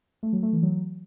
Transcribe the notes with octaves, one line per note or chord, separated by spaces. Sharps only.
A3
F#3
A3
E3
F#3